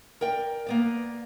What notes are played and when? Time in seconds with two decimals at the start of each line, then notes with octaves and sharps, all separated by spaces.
0.21 A#4 D5 G5
0.66 A#3 B3 D5